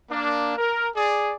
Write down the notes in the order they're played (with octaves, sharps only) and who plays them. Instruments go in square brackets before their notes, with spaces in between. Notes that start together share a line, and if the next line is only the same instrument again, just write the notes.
[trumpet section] A#3 D4
A#4
G#4 D5